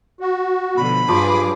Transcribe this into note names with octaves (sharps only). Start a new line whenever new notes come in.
F#4
B2 D3 F3 B5
G2 F3 F#3 G#4 D5 D6